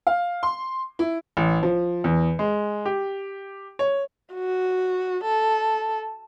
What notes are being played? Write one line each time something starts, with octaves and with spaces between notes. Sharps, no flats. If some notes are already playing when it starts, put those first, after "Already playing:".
F5
C6
E4
A1
F3
E2
G#3
G4
C#5
F#4
A4